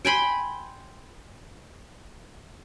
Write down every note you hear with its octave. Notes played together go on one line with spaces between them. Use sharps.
G5 G#5 B5 C6